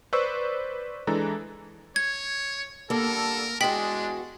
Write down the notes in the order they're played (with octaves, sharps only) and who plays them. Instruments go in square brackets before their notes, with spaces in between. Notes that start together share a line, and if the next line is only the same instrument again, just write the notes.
[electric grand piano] B4 C5 D5 C#6 E6
E3 G#3 D4 A4 A#5
[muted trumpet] C#5 [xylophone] G#6
[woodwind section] D3 G3 A4 [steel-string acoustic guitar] A#3 [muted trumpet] A#4
[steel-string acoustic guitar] E2 F#4 [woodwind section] G#3 [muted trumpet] D4 [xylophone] G5 B6 F#7